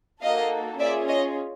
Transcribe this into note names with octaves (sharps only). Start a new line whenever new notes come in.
A#3 D#4 F#4 A4 D#5 F5
C#4 F4 G#4 D5 E5
C#5 D#5